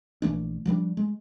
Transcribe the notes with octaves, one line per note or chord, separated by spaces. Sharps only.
A#1 E3 A3 D4
F3 G3 A3 D4
G#3